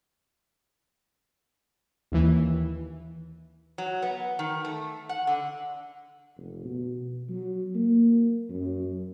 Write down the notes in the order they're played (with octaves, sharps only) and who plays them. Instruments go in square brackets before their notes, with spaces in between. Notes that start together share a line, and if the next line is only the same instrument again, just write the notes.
[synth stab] D#2 E3
[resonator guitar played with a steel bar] F#3
B3
D#3
A3
F#5
D3
[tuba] F1
B2
F#3
A#3
F#2